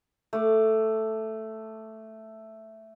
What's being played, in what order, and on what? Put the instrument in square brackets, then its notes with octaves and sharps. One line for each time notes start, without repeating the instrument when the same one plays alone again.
[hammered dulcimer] A3 D6